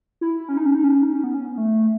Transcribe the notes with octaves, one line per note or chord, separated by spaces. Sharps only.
E4
C#4
D#4
C#4
D#4
C#4
D#4
C#4
B3
C#4
B3
A3